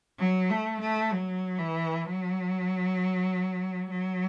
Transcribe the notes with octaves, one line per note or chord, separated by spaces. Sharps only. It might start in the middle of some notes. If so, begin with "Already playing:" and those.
F#3
A3
A3
F#3
E3
F#3
F#3